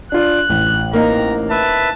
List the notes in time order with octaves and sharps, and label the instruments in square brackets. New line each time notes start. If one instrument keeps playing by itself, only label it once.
[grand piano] D4 F4 D5 [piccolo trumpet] F#6
[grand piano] A1
[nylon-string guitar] A#3 C4 D#4 [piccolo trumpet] A#5
[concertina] B4 E5 [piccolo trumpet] A5